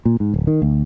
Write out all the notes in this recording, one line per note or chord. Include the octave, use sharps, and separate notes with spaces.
A#2
G#2
D1
D#3
D2